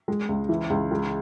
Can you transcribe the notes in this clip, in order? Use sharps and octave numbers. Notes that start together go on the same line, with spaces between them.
G#3
C#2
E3
C#2
G#3